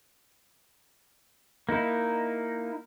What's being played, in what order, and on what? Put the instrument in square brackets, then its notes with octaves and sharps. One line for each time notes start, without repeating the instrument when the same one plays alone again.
[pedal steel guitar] A#3 D#4 E4